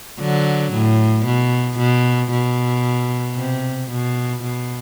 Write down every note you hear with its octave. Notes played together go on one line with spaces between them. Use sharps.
D3 F#3
A2
B2
B2
B2
C3
B2
B2